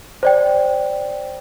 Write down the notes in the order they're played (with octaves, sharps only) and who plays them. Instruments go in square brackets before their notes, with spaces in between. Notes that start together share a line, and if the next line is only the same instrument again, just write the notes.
[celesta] C5 D5 G5